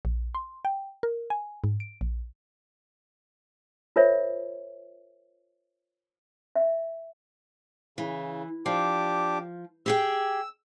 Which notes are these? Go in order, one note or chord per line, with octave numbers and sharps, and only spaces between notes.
A#1
C6
G5
A#4
G#5
G#2
D7
A#1
F4 A#4 C5 C#5 E5
E5
C#3 E3
F3 D4 G4 D6
G4 G#4 G5 E6